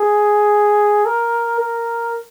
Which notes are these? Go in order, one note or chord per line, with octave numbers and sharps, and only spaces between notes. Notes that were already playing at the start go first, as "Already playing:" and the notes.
Already playing: G#4
A#4
A#4